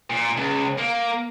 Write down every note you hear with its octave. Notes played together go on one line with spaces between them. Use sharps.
A#2
C#2
A#3